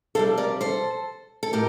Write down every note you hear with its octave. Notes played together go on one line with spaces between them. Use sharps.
F2 C3 G3 A4 C5
A#4 D5
A4 C5
A4
A2 G4 A#4